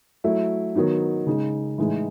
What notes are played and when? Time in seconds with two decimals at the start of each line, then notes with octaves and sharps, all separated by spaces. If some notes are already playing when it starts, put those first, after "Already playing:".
0.24 F#3 A3 E4
0.75 D#3 F#3 B3 D#4
1.27 C#3 G#3 D#4
1.78 A2 E3 G#3 D#4